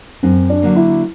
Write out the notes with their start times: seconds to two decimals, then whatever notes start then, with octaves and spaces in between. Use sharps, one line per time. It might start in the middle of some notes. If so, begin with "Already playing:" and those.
0.23 F#2 C4
0.50 D4
0.62 D3 F#3 A#3
0.76 E4